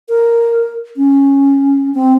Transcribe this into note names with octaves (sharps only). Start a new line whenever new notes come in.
A#4
C#4
C4